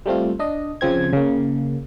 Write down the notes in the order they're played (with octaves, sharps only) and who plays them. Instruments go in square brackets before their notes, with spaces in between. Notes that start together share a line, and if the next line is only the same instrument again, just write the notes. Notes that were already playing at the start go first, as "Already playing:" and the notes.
[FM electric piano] G3 A3 C4 F4
D4 D#5
C#3 F3 C4 G#6
C#3 A#3